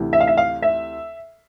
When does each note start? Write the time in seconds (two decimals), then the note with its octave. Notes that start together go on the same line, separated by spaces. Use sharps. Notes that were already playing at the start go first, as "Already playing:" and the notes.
Already playing: D2 C3 E3
0.13 E5
0.20 F5
0.27 E5
0.38 F5
0.62 E5